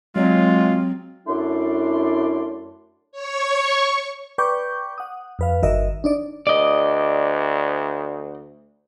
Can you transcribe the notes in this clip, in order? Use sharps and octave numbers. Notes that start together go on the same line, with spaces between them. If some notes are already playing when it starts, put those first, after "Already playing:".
F#3 G#3 C4 F4
F#2 A3 D4 E4 D5 C6
C#5 C#6
B4 D5 G5 C#6 D6 G6
F#5 D#6
F2 B4 F5
G1 D#3 F#4 A#4 D#5 E5
D4 D#4 D5
D2 D5 D#5